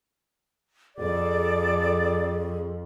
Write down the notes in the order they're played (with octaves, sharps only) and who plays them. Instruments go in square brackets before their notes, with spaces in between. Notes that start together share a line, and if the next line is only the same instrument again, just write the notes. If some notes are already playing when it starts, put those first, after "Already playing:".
[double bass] F2 [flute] G#4 [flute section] A4 D5 D6